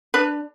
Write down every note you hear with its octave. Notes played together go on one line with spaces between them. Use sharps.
D4 B4